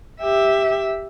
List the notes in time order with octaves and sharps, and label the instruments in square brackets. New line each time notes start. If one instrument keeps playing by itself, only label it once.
[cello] G4 E5